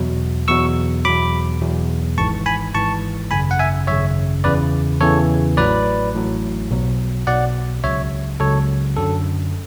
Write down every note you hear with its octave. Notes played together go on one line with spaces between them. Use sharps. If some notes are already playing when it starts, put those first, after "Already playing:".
Already playing: E2 B2 F#3
E2 B2 F#3 C#6 E6
E2 B2 F#3 B5 D6
E2 B2 F#3
G#1 G#2 E3 A5 C#6
G#5 B5
G#1 G#2 E3 A5 C#6
G#1 F#2 C#3 G#5 B5
F#5
E5 G#5
G#1 F#2 C#3 C#5 E5
E2 C#3 E3 B4 D5
E2 C#3 E3 A4 C#5
A1 A2 F#3 B4 D5
A1 A2 F#3
B1 B2 F#3
B1 B2 F#3 D5 F#5
C#2 C#3 F#3 C#5 E5
C#2 C#3 F#3 A4 C#5
F#2 D3 F#3 A4